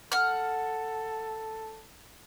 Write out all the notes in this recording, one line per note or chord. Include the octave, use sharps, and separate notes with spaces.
A4 F#5 F6